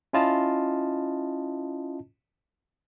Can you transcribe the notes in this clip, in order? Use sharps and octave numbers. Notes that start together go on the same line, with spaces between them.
C#4 E4 F4 D#5 A5